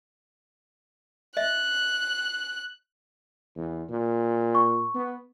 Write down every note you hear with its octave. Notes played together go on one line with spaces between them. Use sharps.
D#5 E5 F#6
E2
A#2
C#6
B3